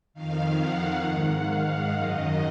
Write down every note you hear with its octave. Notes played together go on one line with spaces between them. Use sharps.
F2 D#3 F5
F#5
G#2 D#3 F#5
F5
F#5
F#2 D#3 D#5